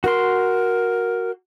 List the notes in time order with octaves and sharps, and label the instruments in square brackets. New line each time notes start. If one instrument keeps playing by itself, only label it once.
[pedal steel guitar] F#4 C6 [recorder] A#4